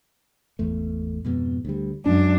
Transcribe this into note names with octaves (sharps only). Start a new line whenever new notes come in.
G#1 E2 A3
F2 G#2 B2
D2 G3
F#2 G#3 A#3 C#4 D4